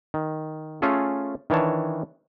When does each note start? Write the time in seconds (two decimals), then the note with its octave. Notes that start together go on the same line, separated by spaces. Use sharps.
0.14 D#3
0.82 A3 C#4 F4 G#4 A4
1.50 D#3 E3 D4 C#5 A5